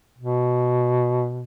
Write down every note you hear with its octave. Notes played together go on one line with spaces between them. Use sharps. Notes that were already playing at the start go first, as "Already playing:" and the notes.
B2